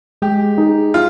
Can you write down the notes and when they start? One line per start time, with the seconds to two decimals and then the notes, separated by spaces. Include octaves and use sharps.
0.22 G#3 G4
0.58 D#4 G#4
0.94 F4